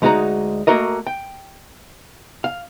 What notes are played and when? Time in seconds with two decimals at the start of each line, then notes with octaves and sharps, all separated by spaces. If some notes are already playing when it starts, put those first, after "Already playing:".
0.02 D2 G#3 D#4 F#4 F#5 A#5
0.67 A3 A#3 F#4 A#4 D#5
1.07 G5
2.44 F5